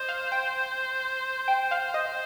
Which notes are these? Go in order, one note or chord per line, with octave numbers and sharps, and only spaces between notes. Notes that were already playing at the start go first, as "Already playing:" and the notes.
Already playing: C5 D#5
F5
G5
G5
F5
D#5